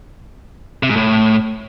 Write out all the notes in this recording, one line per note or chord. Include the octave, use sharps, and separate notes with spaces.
C3
G#2
A2